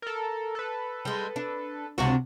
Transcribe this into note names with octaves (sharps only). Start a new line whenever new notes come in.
A4 A#4
A4 B4
G3 G#3
D4
C#2 C3 D4 F#4